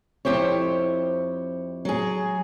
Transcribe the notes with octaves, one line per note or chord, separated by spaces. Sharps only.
F2 E4 G4 C5 C#5
F#3 G#4